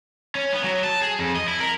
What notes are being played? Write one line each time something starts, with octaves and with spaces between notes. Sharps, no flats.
C#4
B3
F#3
A5
G#4
F2
D#5
E4
A#4